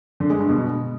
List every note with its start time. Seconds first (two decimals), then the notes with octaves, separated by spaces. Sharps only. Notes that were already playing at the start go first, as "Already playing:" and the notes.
0.20 D3
0.30 G#3
0.40 G2
0.49 B2